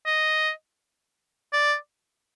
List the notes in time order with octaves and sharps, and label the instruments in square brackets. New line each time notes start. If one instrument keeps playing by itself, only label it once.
[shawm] D#5
D5